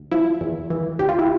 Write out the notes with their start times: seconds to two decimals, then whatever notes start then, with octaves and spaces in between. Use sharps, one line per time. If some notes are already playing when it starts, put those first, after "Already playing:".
Already playing: D2
0.11 F3 E4
0.41 E2
0.70 E3
0.99 D2 G4
1.09 F4
1.19 E4